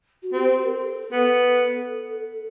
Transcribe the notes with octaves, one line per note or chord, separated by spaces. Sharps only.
F#4
C4 G4
A#4
A4
B3 A4